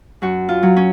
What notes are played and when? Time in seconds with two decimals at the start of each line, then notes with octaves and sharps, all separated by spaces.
0.22 F#2 F#4
0.49 F4
0.63 F#3
0.76 C#4